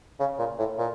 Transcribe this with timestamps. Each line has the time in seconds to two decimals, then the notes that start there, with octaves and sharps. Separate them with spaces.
0.20 C#3
0.39 A#2
0.59 A2
0.78 A#2